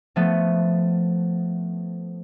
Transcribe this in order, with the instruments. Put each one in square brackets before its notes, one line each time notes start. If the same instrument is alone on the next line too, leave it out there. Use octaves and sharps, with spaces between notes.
[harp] F3 A3 B3